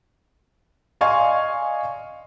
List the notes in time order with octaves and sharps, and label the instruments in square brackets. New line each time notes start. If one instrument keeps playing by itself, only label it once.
[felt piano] D5 D#5 F5 G#5 C6 C#6